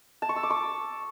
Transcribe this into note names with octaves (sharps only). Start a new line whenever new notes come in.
A5
C#6
E6
D6
C#6